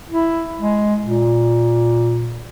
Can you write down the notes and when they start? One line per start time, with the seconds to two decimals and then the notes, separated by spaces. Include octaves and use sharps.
0.10 E4
0.59 G#3
1.03 A#2